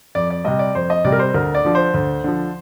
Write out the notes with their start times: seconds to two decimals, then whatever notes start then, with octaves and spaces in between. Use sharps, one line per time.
0.15 F2 D5
0.30 D5
0.45 C3 G3 D#5
0.59 D5
0.75 F2 C5
0.90 D#5
1.05 C3 G3 D5
1.12 A#4
1.19 C5
1.34 D2 A#4
1.55 D5
1.65 D3 F3
1.75 C5
1.94 D2
2.24 D3 F3